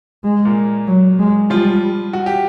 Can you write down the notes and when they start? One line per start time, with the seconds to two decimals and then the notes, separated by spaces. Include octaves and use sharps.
0.24 G#3
0.45 A#2 A#3
0.87 F#3
1.19 G#3
1.50 F3 G3 F4
2.13 F#4
2.26 G4